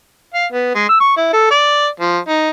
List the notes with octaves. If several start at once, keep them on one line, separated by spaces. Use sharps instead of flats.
F5
B3
G#3
E6
C#6
E4
A4
D5
F3
D#4